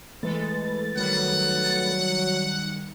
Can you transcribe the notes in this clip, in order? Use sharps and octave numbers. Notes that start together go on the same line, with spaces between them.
E3 G#3 A3 A4 B4 A6
D#3 F#3 G3 F#5